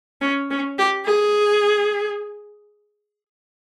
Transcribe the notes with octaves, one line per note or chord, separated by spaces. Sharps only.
C#4
C#4
G4
G#4